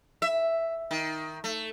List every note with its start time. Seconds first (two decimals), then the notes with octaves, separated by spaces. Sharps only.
0.22 E5
0.91 D#3
1.44 A3